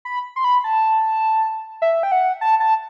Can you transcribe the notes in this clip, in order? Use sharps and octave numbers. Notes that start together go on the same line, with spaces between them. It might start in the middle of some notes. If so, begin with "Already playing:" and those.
B5
C6
B5
A5
E5
G5
F#5
A5
A5